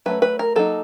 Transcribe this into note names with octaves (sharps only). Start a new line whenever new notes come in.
F#3 A3 C#4 B4
B4
A#4
F#3 A#3 D#4 A4